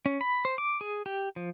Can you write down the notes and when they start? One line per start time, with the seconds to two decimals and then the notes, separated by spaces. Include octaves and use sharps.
0.06 C#4
0.21 B5
0.45 C5
0.58 D6
0.81 G#4
1.06 G4
1.36 F3